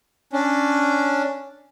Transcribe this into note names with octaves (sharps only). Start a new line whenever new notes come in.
C#4 D4